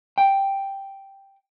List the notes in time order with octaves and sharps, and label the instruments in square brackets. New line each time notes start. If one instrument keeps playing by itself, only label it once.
[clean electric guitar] G5